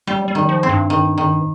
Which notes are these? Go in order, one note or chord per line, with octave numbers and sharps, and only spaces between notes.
G3 G4
G3
D#3
F3
C4
G2
D#3
D#3